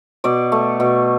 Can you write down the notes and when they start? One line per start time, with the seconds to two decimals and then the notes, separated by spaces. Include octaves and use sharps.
0.24 B2 D5
0.52 A3
0.80 B2